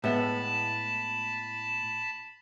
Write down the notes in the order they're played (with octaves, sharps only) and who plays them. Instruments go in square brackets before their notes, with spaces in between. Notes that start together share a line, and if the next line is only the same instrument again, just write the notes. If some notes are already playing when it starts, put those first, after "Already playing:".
[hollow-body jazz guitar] A2 G#3 B3 [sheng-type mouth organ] A5 B5